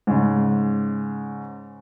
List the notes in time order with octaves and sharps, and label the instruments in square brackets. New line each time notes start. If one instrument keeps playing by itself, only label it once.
[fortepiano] G#2 C#3